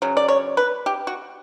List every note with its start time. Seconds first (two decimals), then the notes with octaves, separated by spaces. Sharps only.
0.02 C#3 F#3
0.17 D5
0.28 C#5
0.57 B4
0.86 G4
1.07 F#4